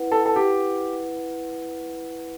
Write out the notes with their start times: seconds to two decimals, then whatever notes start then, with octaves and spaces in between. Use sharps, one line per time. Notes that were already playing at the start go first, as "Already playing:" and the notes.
Already playing: E4 B4 F#5
0.12 A4
0.26 A4
0.36 G4